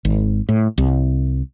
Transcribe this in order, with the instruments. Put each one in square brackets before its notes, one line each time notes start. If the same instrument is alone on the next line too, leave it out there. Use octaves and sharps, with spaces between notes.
[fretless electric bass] G#1
A2
C2